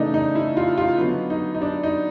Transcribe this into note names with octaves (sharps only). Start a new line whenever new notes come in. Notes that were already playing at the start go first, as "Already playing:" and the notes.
Already playing: C#3 E3 A3 D4 D#4
D#4
E4
F4
F4
D3 F#3 B3
D#4
D#4
D4
D#4